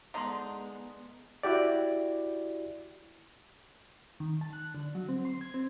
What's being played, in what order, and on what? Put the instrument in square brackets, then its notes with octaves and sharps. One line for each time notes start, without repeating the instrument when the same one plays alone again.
[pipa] D3 D#4 [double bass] G#3 B3 [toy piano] A#5 C6
[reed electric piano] E4 F#4 G4 D5
[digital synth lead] D#3
A5
F#6
D3
F#3
C4
C6
G#6
C4